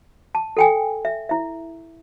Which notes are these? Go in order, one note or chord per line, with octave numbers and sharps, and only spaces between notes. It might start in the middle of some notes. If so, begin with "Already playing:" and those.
A5
A4 G5 G#5
E5
E4 E5